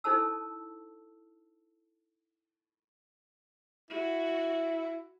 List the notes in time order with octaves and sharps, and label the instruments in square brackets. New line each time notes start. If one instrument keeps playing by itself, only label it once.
[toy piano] D#4 E4 A4 C5 A5 E6
[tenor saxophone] E4 [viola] F#4